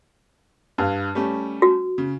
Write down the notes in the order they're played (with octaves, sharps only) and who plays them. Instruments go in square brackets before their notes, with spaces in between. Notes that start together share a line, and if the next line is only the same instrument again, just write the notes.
[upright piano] G2 F5
G3 A3 C#4
[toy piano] F#4
[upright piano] C#3